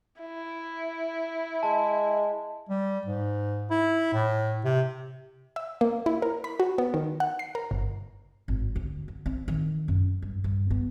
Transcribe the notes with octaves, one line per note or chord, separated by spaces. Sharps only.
E4
G#3 A5
G3
G#2
E4
A2
C3
E5
A#3
E4
A#4
B5
F#4
B3
D#3
F#5
C7
A#4
G1
G#1
D2
D3
C4
D#3
F#2
G2
G2
B3